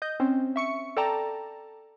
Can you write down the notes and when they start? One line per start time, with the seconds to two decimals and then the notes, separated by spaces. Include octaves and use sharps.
0.02 D#5 G6
0.20 C4 C#4
0.56 E5 C#6 C#7
0.97 A4 D5 G5 A5 A#5